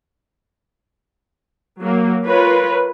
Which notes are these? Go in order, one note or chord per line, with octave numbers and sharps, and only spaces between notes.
F#3 A#3
F4 A#4 B4 C#5